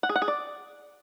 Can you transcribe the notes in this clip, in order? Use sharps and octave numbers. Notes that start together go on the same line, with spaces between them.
F#5
G#4
F#5
G#4
D5